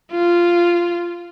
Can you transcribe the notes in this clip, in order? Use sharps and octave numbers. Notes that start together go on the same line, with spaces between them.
F4